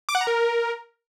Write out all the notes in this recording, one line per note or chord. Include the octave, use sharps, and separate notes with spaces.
D6
F#5
A#5
A#4